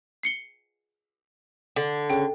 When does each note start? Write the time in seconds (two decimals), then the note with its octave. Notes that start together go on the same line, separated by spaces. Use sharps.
0.23 C7 C#7 G7
1.76 D3
2.10 C#3 G5